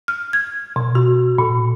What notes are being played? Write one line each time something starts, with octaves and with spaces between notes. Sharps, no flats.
F6
G#6
B2
F#4
A#2